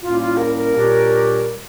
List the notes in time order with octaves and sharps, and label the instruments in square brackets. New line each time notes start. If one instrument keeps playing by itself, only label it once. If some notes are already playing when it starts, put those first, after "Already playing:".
[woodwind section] A2 G3 A#3 C#4 [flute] F4
[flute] F4
A#4
A#4
[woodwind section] A#2 G3 D4 G4 C#5